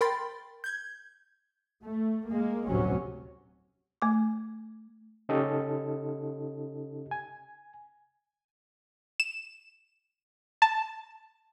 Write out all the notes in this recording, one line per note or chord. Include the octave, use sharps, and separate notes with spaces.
A#4 G5 B5 C6 A6
G6 G#6
A3
G#3 A#3
F1 D2 A2 C3 F#3 C#4
A3 D6
C#3 C#4 D#4 G4 A4 D#5
G#5
E7
A5